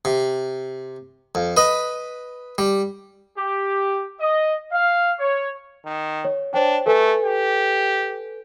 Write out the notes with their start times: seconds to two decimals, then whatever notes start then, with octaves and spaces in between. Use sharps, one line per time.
0.05 C3
1.35 F2
1.57 B4 D#5 B5
2.58 G3
3.37 G4
4.20 D#5
4.72 F5
5.19 C#5
5.86 D#3
6.25 C#5
6.54 D4 C5 C#5 G5
6.86 A3 A4 B4 G#5
7.24 G4